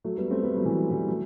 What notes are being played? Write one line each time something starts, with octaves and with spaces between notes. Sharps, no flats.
F#3 A3
G3 B3
A3 C4
G3 B3
F#3 A3
E3
F#3
E3 G3
F#3 A3